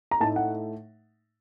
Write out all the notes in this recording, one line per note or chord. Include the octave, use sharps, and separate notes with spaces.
A#5
A2 A3 D#4 A5
F#5